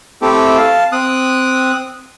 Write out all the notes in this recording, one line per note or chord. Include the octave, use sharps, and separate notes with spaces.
A3 C4 E4 G4 A4
F5 A5
C4 D#6 F#6